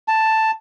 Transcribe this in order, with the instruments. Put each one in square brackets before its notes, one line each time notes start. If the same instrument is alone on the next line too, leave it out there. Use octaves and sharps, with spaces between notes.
[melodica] A5